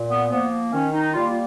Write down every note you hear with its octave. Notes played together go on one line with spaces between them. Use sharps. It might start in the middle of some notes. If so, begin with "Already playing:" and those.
Already playing: A#2
B3
F3 A#3 B3
D#3 C#4
D#4
G3 A#3 F4